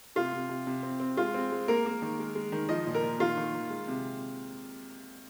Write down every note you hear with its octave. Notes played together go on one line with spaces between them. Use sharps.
C3 F4
C3
C3
C3
C4
C4
G#3 F4
C4
G#3
A#3 A#4
A#3
D#3
G#3
G#3
D#3
F3 D#5
A#2
A#4
A#2
D#3 F4
D#3
D#3
G#3
C3